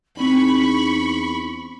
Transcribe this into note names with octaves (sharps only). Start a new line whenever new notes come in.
E2 C4 D4 D#4 B5 C#6